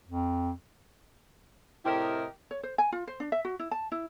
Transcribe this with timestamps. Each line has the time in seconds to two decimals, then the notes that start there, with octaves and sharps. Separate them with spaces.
0.08 F2
1.85 A2 C3 E4 G4 A#4 D#5
2.51 C#5
2.63 C5
2.78 G#5
2.92 F4
3.07 C5
3.20 D4
3.32 E5
3.45 F#4
3.59 E4
3.71 A5
3.92 E4